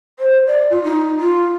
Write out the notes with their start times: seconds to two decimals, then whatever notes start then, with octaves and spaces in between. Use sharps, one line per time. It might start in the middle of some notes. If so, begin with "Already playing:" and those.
0.19 C5
0.47 D5
0.70 F4
0.84 D#4
1.20 F4